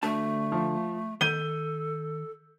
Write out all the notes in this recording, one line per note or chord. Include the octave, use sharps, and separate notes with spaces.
D2 D3 A3 A5
F3
D#3 A4 G6 D#7 G7